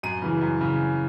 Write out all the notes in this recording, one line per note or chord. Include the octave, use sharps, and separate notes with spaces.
F#2 D#7
C#3 E3
F#2
C#3